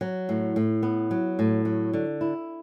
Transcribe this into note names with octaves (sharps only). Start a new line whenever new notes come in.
F#3
A2
A2
B3
F#3
A2
F#3
D3
E4